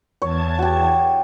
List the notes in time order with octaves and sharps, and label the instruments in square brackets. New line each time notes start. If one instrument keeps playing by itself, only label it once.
[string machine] E2 A5 G#6 [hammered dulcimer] C#5
[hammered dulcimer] F#4 G4